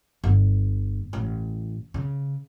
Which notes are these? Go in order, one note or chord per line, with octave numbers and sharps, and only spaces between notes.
G1
A1
C#3